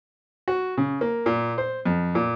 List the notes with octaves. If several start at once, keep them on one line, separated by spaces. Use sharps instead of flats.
F#4
C#3
A#3
A#2
C5
F2
A#2